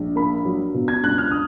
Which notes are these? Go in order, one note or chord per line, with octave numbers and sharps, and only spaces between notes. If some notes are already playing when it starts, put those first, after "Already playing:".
Already playing: A#1 G#2
A#3 B5
F#3
B2
G#6
C#2 F#6
F6
D#6